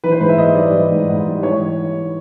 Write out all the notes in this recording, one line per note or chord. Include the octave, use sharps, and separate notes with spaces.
E3 B4
C5
G#2 B4
E5
G#2 D#5
G3 D5
E3
G#2
G#2
G3
E3 C#5